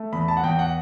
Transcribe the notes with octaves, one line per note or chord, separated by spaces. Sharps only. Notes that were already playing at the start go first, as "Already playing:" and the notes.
Already playing: A3
E2 B5
A5
F#5
E2 G5
F#5